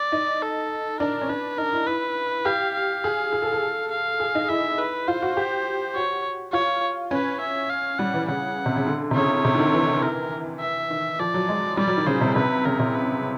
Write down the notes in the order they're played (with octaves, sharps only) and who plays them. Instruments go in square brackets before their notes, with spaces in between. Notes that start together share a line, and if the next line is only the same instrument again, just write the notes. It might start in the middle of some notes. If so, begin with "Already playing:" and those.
Already playing: [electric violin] D5
[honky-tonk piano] D#4
[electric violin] A4
[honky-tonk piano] D4 [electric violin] A#4
[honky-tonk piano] C#4
[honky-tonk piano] D4 [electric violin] B4
[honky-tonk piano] D#4 [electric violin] A#4
[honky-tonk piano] E4
[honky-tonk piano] E4 [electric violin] B4
[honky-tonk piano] G4 [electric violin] F5
[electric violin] F5
[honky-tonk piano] G#4
G#4
A4
A4
[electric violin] F5
[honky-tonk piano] G#4
D#4
[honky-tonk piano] E4 [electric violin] E5
[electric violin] B4
[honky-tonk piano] F4 [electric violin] C5
[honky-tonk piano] F#4
G4
[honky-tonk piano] F#4 [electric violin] C#5
[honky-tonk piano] F4 [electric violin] C#5
[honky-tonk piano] C#4 [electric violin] B4
[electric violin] E5
F5
[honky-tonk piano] G3 [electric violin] F#5
[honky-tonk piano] E3
[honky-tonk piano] C#3 [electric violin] F#5
[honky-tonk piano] C3
C#3
D3
C3
[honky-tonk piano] C#3 [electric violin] C#5
[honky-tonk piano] C3
D3
D#3
E3
[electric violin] A#4
E5
[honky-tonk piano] D#3
[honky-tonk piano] F3 [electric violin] D5
[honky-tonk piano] F#3
G#3
[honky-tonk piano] G3 [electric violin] D5
[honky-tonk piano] F#3
D#3
[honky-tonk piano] C#3 [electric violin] C5
[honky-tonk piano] C3
[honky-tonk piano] C3 [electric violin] B4
[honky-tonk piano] C#3 [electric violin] A#4
[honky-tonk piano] C3
[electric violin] B4